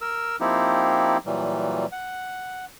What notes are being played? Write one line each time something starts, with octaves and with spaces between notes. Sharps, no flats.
A#4 E6
F3 A#3 C4 D#4 E4 G4
A#2 E3 F#3 G3
F#5